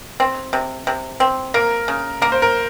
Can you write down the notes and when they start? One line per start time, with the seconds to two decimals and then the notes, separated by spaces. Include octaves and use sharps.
0.20 C4
0.53 C3
0.87 C3
1.20 C4
1.54 A#3 A#4
1.88 C#3
2.22 A#3 A#4
2.32 C5
2.42 A#4